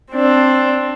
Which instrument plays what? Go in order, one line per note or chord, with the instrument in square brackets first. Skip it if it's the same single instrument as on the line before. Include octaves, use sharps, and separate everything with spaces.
[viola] C4 D4